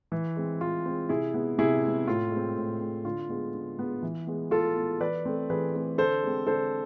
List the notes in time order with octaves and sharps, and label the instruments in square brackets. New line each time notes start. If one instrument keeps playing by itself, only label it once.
[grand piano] E3
G#3 C4
E3 F4
G#3 C4
C3 E4 G#4
G#3 B3
C3 E4 G#4
G#3 B3
A2 F4
G#3
C4
A2
G#3 C4
D3 F4
G#3 B3
D3
G#3 B3
E3
G#3 B3
E3 F4 A4
G#3 B3
E3 B4 D5
A3 C4
E3 G#4 B4
A3 C4
D3 A4 C5
G#3 C4
D3 A4 C5